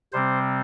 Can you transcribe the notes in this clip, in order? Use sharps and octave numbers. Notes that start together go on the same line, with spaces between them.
C3 G3 C4 C5